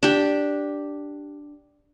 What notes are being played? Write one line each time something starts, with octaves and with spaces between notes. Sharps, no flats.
D4 G4